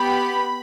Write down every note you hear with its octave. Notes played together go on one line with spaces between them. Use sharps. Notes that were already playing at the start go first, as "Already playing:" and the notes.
Already playing: B3 G4 B5